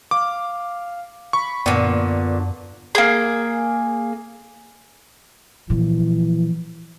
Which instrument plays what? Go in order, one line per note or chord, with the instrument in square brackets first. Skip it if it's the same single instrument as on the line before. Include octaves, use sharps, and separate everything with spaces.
[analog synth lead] F5 [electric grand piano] D6
[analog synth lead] B5 [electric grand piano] C#6
[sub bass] F#2 [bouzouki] A#2 D3 [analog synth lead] B3
[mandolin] A#3 G#4
[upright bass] A#2 F3 [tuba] E3